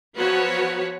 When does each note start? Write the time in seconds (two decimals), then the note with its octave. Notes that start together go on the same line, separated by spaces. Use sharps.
0.18 F3 F#3 B3 F#4 B4 C#5